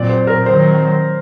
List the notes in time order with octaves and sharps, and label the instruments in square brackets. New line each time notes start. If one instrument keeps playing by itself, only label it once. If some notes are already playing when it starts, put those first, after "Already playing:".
Already playing: [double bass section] A#2 F#3 C4 [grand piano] D5
[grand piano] C5
A#4
[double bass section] D#3 F#3 C4 [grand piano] C5